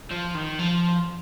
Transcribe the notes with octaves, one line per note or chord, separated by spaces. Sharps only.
F3
D#3
F3